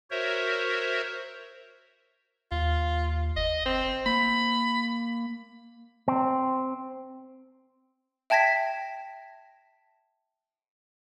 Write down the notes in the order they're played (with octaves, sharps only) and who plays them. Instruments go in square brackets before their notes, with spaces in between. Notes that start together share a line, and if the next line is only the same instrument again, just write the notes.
[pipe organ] F#4 A#4 C5 C#5 E5
[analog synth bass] D#2 [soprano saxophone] F4
[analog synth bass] F#1 [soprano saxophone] D#5
[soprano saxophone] C4
[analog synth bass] A#3 [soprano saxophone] B5
[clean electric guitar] C4
[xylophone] E5 G5 A5 G#6 A#6 B6